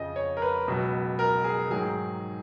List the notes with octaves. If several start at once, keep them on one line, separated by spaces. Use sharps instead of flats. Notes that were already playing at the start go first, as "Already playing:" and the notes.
Already playing: F2 C#3 F3 D#5
C#5
A#4
B4
C#2 B2 F#3
A#4
G#4
G#2 D#3 F#3 G#4